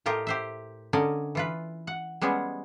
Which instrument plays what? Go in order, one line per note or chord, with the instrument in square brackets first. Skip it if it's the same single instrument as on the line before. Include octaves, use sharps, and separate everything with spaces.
[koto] A2 F4 G4 A#4 D#5 A#5
G4 C5 E5
D3 C#4 A#4 D5 D#5
E3 F4 B4
F#5
G3 G#3 B3 C#4 G#4